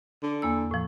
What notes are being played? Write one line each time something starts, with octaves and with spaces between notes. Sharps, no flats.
D3
E2 A#3 E6
A2 F3